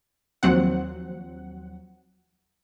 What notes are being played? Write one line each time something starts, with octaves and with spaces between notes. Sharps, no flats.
D#2 F3 F#3 C4 F#5